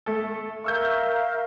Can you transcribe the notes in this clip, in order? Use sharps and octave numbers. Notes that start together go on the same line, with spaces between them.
A3 A4
A#4 E5 F5 C#6 E6 G6